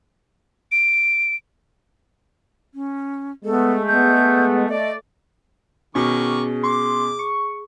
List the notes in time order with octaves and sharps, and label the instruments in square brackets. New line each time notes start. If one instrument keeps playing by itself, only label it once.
[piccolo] D7
[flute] C#4
[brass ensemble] G#3 A3 [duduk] B3 [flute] A4
[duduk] B3 [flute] G6
[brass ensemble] A3 D5 [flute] D#5
[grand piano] B2 C#4 [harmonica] D#3 C#6 D6 [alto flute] G#4
[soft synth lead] C6 [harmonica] D6
[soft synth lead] C#6